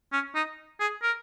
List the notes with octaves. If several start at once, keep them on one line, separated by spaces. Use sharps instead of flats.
C#4
D#4
G#4
A#4